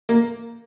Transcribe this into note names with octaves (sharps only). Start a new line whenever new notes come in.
A#3